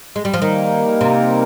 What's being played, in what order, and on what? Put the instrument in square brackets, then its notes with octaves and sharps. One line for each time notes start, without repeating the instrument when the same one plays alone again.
[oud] G#3
G3
F3
[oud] D#3 [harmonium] G3 A#3 D#4 A#4
[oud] C3